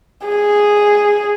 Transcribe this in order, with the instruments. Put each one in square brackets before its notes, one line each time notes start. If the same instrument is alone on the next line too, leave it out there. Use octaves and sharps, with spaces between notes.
[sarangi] G#4